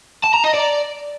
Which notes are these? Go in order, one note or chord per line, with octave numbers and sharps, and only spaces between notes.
A5
A#5
D#5
D5